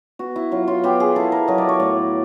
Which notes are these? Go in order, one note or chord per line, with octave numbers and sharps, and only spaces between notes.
B3 F#4
E4
F#3 F4
F4
B3 G4
G#4
E4 A4
A#4
F#3 D#5
D5
C#5
A2 D5